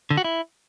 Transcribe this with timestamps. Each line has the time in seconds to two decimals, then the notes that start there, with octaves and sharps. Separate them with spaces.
0.10 D3
0.17 F#4
0.24 E4